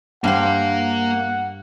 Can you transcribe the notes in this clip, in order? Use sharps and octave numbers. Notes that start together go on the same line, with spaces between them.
G2 A#3 C5 F5 F#5